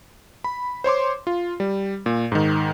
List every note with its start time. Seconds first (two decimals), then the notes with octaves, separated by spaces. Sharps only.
0.44 B5
0.84 C5 C#5 C6 D6
1.27 F4
1.60 G3
2.06 A#2
2.32 G#2 D#3